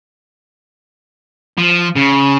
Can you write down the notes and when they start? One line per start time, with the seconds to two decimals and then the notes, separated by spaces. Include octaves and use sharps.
1.58 F3
1.96 C#3